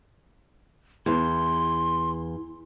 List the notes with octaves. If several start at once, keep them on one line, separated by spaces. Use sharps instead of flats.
E2 C6